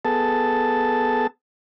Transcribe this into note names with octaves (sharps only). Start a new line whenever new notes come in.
B3 G#4 A4 A5